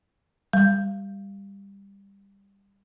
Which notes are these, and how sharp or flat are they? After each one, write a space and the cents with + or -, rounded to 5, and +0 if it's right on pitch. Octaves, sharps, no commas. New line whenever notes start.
G3 +15